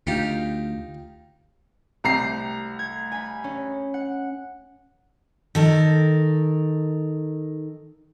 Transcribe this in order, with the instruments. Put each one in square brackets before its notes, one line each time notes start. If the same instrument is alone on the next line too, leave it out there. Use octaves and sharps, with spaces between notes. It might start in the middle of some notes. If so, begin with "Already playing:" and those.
[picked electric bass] D2 [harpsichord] D#4 F4 G4
[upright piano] C2 A#5 C7 [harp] A3 G4
[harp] G#6
G#5 B5
C#4
F#5
[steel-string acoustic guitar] D#3 A4 A#4